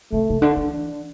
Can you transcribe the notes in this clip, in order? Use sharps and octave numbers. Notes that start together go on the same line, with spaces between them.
C3 A3
C3
D3 D4
E3
D4